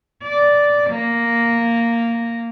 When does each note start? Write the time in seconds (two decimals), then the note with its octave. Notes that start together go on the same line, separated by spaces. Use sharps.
0.23 D5
0.90 A#3